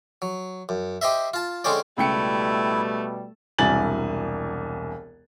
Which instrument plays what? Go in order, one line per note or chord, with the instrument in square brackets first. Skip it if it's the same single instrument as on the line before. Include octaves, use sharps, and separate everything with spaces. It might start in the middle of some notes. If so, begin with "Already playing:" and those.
[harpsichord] F#3
F#2
G4 C5 D#5 E5
F4 A5
D3 G#3 C4 C#4 C5 D5
[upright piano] C#2 G5 C#7 [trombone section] B2 G3 [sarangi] A3 [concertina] E4
[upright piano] E1 C2 G#5 A6 F#7